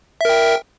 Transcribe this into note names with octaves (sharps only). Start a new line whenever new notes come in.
A#4 E5 G5